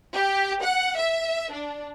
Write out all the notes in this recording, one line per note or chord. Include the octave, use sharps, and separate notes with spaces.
G4
F#5
E5
D4